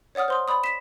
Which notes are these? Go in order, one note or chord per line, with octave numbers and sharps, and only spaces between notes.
C#5 D5 F#5 D#6 F6
C5 C6 D#6
D5 B5 D#6
B6 E7